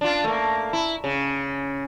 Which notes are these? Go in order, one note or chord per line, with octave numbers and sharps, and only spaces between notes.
D4 F4
A3 A#3
E4
C#3